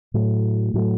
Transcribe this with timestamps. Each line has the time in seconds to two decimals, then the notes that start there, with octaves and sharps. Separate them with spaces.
0.14 A2 F#3 A3
0.74 A2 F#3 A3